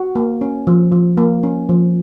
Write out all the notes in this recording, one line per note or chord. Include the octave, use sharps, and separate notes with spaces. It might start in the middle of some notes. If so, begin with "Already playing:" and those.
Already playing: F#4
A#3
C#4
F3
F3
A#3
C#4
F3